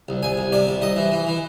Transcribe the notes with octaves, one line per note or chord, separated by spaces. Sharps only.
C2
C2 G#5
C2
C3 D5
C2
C2 D#5
E3
E3
E3